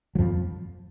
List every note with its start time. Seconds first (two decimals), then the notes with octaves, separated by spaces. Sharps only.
0.15 F#3
0.19 F2 F3